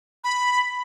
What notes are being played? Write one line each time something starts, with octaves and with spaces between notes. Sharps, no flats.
B5